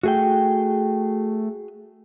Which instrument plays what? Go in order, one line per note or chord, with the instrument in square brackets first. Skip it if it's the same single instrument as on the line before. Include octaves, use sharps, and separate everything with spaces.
[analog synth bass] A3 [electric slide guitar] F#4 G#4 G5